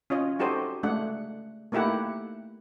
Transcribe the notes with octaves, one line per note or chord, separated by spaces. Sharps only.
C#4 F4 C#5 D#5
D#4 F#4 G4 A4 C5 D#5
G#3 A3 D4 F#5
A3 A#3 D#4 E4 G4 F#5